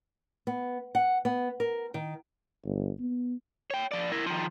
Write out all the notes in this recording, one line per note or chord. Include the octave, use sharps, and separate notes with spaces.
B3
F#5
B3
A#4
D#3
G1
B3
C#5 G5
F3 D5
E4 A#4
D#3 F3